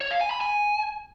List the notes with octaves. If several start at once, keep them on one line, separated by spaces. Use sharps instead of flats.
C#5
F5
G#5
B5
G#5